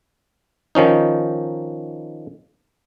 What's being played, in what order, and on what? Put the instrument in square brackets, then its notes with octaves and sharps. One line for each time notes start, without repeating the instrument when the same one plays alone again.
[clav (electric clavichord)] D#3 F3 C#4 D#4